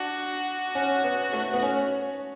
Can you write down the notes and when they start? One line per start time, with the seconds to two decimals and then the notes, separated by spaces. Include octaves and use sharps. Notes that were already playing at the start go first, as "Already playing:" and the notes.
Already playing: D4 F#4
0.75 C#4
1.04 B3
1.33 A3
1.53 B3
1.63 C#4